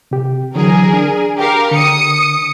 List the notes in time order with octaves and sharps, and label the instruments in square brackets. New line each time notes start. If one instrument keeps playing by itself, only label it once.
[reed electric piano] C3 G4
[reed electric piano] D3 E3 F#3 [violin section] G#4 A#4
[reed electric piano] D4
[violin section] G4 A#4 F5
[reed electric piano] D3 [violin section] D#6 C#7